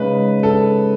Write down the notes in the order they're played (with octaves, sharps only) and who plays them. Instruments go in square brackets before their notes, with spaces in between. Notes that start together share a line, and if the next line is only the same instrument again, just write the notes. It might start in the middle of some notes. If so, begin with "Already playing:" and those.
Already playing: [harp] C#3 G#3 D#4 G#4 D#5 [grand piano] B4
[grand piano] A4